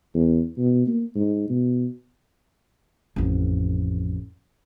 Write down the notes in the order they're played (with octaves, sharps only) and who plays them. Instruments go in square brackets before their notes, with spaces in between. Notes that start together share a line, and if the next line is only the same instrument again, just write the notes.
[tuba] E2
B2
A#3
G#2
B2
[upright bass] A1 F2